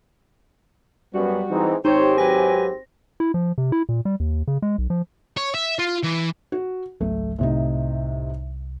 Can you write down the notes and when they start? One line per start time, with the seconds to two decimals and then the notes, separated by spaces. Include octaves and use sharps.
1.14 F#2 G3 B3 F#4
1.51 G#2 E3 C4 D#4
1.85 G#1 C4 D#4 G4 C5 C#5
2.18 F#3 B4 G#5 A#6
3.20 E4
3.34 F3
3.58 C3
3.72 E4
3.89 A#2
4.05 G3
4.20 D#2
4.48 C#3
4.62 G#3
4.78 B1
4.90 F3
5.37 C#5
5.54 E5
5.79 F4
6.04 E3
6.52 F#4
7.01 G#1 C#2 F#3 A3
7.39 C2 A2 C3 D#4